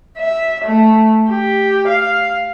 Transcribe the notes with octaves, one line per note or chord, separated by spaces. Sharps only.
E5
A3
G4
F5